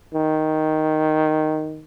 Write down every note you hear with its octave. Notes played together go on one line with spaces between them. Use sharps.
D#3